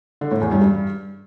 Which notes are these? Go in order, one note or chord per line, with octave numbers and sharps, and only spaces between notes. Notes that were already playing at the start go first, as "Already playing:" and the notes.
D3
A2
E2
G2
G2